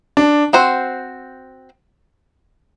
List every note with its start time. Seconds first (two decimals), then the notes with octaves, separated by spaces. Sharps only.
0.17 D4
0.53 C4 F#4 C5